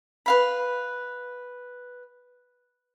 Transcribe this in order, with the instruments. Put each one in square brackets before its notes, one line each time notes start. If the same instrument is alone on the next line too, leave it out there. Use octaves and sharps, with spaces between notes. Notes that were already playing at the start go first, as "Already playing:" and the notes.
[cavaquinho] B4 F5 B5